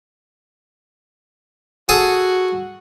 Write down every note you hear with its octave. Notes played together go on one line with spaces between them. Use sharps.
F#4 G#4 A4 G#5